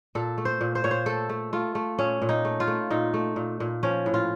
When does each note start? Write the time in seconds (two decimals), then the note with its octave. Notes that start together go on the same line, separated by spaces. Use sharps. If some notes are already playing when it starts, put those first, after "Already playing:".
0.15 A#2 A4
0.38 A3
0.45 C5
0.61 A#2
0.75 C5
0.84 A#2 C#5
0.91 C5
1.06 A3 A4
1.29 A3
1.53 A3 F4
1.75 A3
1.99 A#2 C#4
2.22 A#2
2.29 D#4
2.45 A3
2.60 F4
2.67 A3
2.90 A#2 D#4
3.14 A3
3.36 A#2
3.60 A#2
3.83 F3 C#4
4.06 A2
4.14 F4